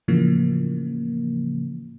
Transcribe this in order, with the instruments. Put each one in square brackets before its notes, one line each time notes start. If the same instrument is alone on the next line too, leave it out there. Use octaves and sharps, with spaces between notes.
[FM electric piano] A2 C#3 E3 F3 A#3